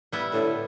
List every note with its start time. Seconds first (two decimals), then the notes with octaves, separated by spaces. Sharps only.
0.12 G3 B3 E4
0.33 A2 D3